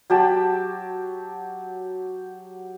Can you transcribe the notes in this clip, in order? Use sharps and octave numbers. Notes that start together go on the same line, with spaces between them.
F#3 G4 A5